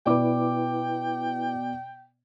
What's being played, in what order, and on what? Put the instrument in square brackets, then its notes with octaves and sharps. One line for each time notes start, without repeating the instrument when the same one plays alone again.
[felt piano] B2 D5 D6 [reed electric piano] E4 B4 [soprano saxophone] G5